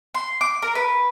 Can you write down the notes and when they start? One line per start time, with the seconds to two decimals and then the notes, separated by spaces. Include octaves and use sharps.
0.14 C6
0.41 D6
0.62 A#4
0.75 B4